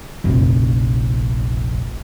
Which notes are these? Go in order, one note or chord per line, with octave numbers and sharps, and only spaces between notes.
F1 A#1